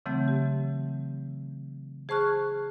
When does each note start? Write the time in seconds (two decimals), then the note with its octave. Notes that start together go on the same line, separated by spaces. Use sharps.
0.06 C#3 E3 F#3 A3 C4
0.28 G4
2.09 G#4 C5 A5 C#6 F6 F#6